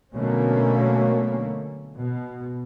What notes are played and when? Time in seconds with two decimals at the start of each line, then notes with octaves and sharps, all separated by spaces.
0.15 B2 D3 F#3 A3 A#3 C#4
1.97 B2